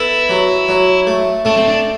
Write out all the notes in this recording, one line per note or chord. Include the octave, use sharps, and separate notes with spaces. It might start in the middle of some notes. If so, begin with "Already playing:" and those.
Already playing: B3 E4 A4
F#3
F#3
A3
A3 D4
C4
D4